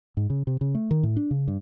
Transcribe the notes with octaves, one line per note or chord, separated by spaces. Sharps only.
G#2
C#3
C3
C#3
A3
D#3
A2
D4
C#3
G2